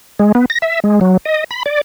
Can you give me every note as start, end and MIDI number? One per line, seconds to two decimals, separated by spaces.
0.19 0.32 56
0.35 0.45 59
0.50 0.58 94
0.62 0.80 76
0.84 1.00 56
1.01 1.17 54
1.25 1.44 75
1.51 1.63 83
1.66 1.81 74